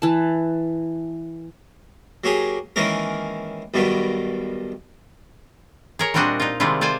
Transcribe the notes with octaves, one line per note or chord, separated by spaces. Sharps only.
E3 A5
F#3 A#3 G4 G#4
D#3 E3 G#3 A#3 C#4 A#4
B1 G2 B2 D#3 G3
G#4 A#4 C#5
A#2 G3 C4 D4 F#4 D#5
D#4 F4
C3 D#3 G3 G#3 E4 F4
F4 C5 D5 G#5